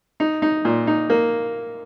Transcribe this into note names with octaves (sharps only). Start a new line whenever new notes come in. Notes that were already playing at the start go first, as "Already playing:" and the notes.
D#4
D#4
A#2
D#4
A#3